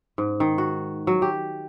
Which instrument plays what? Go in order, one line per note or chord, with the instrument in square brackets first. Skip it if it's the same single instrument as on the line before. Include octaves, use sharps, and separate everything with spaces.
[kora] G#2
D#3
F#4
F#3
G4